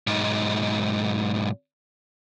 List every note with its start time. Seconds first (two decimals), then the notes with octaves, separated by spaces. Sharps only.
0.07 B1 G#2